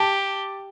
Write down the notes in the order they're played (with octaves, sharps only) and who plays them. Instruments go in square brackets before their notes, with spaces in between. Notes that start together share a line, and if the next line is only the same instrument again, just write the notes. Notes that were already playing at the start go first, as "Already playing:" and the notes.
Already playing: [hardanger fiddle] G4 [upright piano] A5